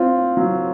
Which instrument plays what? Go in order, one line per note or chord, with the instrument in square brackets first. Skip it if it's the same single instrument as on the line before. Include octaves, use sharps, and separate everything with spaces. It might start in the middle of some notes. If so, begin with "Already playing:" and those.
Already playing: [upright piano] C4 F4
F#3